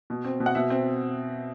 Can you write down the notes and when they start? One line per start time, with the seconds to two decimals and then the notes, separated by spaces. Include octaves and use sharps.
0.10 B2
0.25 C4
0.40 B2
0.46 F#5
0.55 B2 E5
0.70 C4